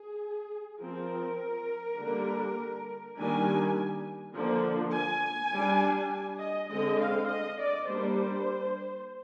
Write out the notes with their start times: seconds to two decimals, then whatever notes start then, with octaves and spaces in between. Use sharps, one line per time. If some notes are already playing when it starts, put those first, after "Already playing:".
Already playing: G#4
0.81 F3 C4 A#4
1.99 D3 G3 A#3 D4
3.17 D#3 G3 A#3 D4 G#5
4.36 D3 F3 A#3 D4
4.94 G#5
5.54 G3 D4
6.41 D#5
6.71 D3 G#3 C4 D#5
7.01 F5
7.29 D#5
7.60 D5
7.89 G3 A#3 D4 C5